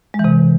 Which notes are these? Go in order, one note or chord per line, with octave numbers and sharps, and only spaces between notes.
G#3
E3
C3